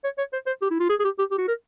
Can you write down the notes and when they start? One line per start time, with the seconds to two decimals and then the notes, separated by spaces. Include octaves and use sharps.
0.04 C#5
0.18 C#5
0.33 C5
0.47 C5
0.62 G4
0.71 E4
0.80 F4
0.89 G#4
1.00 G#4
1.04 G4
1.19 G4
1.31 G4
1.38 F#4
1.48 A#4